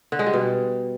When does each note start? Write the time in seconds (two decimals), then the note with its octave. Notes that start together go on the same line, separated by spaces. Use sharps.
0.12 D3
0.19 G#3
0.26 G3
0.33 B2